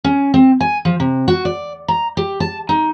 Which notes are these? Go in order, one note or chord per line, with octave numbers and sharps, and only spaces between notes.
C#4
C4
G#5
F3
C3
F#4
D5
A#5
G4
A5
D#4